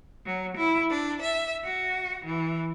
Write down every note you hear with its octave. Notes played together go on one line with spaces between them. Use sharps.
F#3
E4
D4
E5
F#4
E3